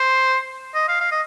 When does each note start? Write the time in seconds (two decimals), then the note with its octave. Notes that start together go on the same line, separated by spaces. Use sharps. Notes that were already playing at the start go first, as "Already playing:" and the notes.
Already playing: C5
0.75 D#5
0.89 F5
1.01 F5
1.12 D#5